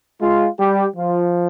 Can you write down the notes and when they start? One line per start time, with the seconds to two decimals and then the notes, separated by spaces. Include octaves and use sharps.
0.21 G#3 F4
0.59 G3 G4
0.96 F3 F4